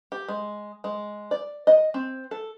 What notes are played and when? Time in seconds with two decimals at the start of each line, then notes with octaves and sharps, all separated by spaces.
0.12 G4
0.28 G#3
0.84 G#3
1.31 D5
1.67 D#5
1.94 C4
2.31 A4